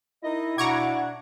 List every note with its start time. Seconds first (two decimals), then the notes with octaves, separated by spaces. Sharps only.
0.24 D#4 E4 A#4 D#5
0.58 B2 D4 F#5 A#5 C#6 D6 G#6